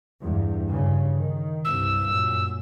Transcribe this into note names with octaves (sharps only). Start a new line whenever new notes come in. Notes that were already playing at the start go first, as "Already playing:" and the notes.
E2 G2
G2 C#3
D#3
C2 G2 E6
F#2 A#2